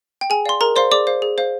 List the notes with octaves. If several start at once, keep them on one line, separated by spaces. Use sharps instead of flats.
G5
G#4 G#5
D5 F5 C6
G#4 A#4 A#5
C5 D5 F5 C6
G#4 D5 D6
C5 F5
G#4
C5 F5